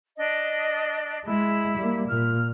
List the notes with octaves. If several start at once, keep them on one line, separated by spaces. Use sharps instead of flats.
D4 D#5
G#3 E4
G3 A#3
A#2 F6